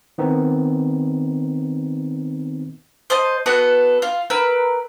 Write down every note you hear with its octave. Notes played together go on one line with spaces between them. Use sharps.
D#3 B3 C4 D#4
C5 D#5 A5
B3 F#4 A4 B4
F4
A#4 B4 E6